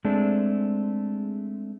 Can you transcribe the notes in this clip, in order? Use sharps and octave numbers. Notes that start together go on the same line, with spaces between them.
G#3 A3 C4 D4